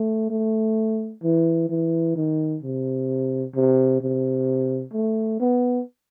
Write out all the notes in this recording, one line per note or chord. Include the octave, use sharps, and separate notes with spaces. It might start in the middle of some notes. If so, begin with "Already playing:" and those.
Already playing: A3
A3
E3
E3
D#3
C3
C3
C3
A3
B3